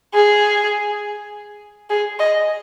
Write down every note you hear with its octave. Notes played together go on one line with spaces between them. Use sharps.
G#4
G#4
D#5